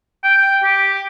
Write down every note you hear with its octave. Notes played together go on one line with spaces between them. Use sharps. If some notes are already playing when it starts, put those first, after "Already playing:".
G5
G4